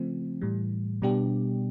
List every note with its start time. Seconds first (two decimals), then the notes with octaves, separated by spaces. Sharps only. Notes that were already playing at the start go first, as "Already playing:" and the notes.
Already playing: C#3 F3 A3 C4
0.41 A2 E3 G3
1.02 B2 G3 B3 D4 G4